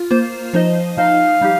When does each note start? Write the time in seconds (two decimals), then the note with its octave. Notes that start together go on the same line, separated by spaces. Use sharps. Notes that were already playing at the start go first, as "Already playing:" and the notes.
Already playing: F4
0.10 A#3 F4 C5
0.53 F3 D#4 C5 D#5
0.97 F3 D#4 C5 D#5 F5
1.41 G3 D#4 G4